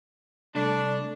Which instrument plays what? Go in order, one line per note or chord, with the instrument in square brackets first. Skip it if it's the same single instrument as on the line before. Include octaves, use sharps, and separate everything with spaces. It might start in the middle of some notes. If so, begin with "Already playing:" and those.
[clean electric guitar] C2 A3 [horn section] D4